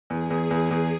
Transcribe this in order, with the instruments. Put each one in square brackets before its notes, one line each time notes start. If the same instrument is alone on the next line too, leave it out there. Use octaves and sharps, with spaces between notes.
[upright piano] E2 [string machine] G#4
[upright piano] E2
E2
E2